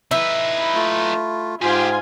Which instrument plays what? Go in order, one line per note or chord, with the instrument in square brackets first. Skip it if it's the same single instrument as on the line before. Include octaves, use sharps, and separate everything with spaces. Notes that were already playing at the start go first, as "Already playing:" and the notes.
[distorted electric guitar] D#4 B4 [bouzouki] E4
[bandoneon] A3 F4
[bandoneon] G#2 [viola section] F4 G#5 [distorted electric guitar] G4 G#4